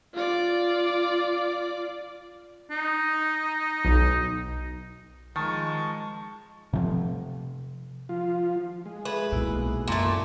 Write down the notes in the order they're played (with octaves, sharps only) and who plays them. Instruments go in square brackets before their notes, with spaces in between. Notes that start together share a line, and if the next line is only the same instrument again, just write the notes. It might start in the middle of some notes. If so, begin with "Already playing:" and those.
[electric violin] F4 D5
[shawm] D#4
[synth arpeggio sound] B1
[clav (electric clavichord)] D#3 [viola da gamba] F3 G#3 [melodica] A5 C#6
[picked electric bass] C3 F3
[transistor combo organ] F3 F4
G#3
[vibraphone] G#4 A4 E5 [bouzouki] B4
[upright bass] B1 A#2 [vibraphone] B3 E4 F#4
[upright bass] F#2 [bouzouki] A#2 A3